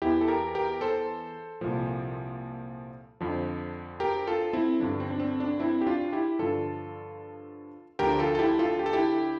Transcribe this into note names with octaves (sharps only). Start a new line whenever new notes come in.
E2 E3 E4 G4
A4
G4 A#4
G4 A#4
A4 C5
C2 A#2 F3
F2 D3 F3
G4 A#4
F4 A4
C4 E4
G2 D3 F3 D4
C4
D4
C4
D4
C4 E4
G4
D4 F4
E4 G4
G2 D3 F3 F4 A4
D2 D3 F3 G4 A#4
F4 A4
A4
E4 G4
F4 A4
G4
A4
E4 G4